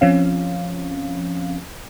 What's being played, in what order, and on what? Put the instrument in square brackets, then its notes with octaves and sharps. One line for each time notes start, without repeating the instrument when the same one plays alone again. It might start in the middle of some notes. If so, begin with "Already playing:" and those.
[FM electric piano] F3 C4 C#4 F5